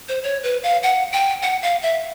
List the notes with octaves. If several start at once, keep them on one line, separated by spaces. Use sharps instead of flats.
C5
C#5
B4
F5
F#5
G5
F#5
F5
E5